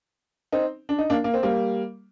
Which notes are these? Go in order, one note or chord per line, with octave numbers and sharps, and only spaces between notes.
C4 D#4
D4
D#4
A#3 D4
A#3
C4
G3 A#3